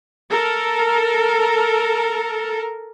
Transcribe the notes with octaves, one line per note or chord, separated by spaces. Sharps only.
A4 A#4